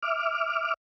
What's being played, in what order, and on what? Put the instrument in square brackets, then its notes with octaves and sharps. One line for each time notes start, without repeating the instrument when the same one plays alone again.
[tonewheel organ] E5 D6 F6